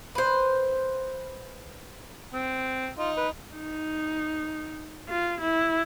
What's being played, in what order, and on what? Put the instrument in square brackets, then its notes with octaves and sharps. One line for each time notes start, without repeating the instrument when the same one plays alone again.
[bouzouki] B4 C5
[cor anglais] C4
[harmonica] D#4 [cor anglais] F4
[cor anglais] B4
[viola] D#4
F4
E4